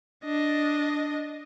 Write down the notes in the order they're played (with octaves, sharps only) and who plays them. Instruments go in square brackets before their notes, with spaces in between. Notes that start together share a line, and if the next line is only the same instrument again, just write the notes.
[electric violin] D4 D#5